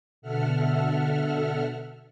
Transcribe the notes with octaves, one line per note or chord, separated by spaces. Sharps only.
B2 D3 A4 E5 F#5 F6